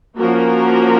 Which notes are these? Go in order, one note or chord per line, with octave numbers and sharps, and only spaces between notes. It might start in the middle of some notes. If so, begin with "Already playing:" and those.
F3 A#3 C#4 F#4 A#4